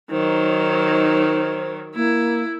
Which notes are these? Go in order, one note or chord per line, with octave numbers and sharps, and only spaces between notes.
D#3 F#3 D#4 C5
A#3 E4